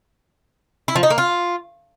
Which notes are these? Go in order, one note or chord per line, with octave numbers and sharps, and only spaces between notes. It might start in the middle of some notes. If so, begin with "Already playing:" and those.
E4
F3
D#4
A#3
F4